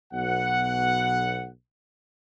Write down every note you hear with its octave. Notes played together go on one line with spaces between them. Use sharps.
B1 B2 F#5